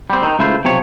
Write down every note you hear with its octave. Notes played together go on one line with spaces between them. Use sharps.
G3 C4
D#3 D#4
C#2 A3 E4 F4 C5
B1 C3 F3 C#5